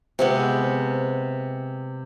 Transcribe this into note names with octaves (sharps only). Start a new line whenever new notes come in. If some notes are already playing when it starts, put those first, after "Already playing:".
C3 G#3 B3